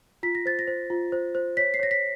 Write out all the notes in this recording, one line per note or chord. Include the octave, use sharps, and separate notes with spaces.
F4 B6
A#6
C5 A6
A#6
C5
F4
C5
C5
C#5 B6
C7
C#5 A#6
B6